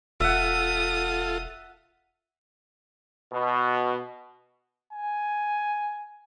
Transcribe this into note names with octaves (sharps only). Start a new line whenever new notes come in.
E1 F4 A4 E5 F#5 D#6
B2
G#5